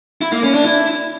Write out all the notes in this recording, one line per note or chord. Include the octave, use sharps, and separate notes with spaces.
E4
A#3
C#4
D4
E4